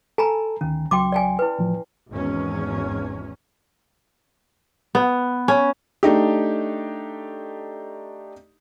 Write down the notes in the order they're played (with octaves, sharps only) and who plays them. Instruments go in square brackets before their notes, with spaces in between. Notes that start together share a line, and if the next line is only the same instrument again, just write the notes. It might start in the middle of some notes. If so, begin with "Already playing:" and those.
[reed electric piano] A4 [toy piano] G#5 A#5 B5
[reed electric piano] D2 D#3 [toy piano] C#4
[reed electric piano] C#2 F#3 [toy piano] G5 C6 D6
[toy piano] D5 G5 G#5
E4 B4
[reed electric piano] A2 E3 F3
[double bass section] G#1 E2 C#4
[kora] B3
C#4
[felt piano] A3 D4 D#4 G4